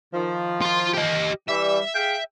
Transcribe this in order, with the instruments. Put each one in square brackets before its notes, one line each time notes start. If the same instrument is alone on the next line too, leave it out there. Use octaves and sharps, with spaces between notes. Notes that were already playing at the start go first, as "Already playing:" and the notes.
[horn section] D#3 F3
[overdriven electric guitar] F4 C6
G4 D#5
[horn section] E3 G3 [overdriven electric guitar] E5
[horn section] G#4 F5 G5